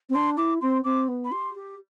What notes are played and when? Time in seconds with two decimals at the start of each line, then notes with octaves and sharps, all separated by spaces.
0.09 C4
0.14 D4 C6
0.37 E4 D6
0.61 C4 C6
0.84 C4 D6
1.08 B3
1.25 B5
1.31 G4 C6
1.55 G4